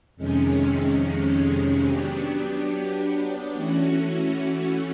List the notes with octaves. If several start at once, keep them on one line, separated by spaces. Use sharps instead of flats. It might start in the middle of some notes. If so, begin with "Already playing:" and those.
F2 C3 D#3 G#3 C#4
F#3 B3 D4 G4
E3 A3 C#4 F#4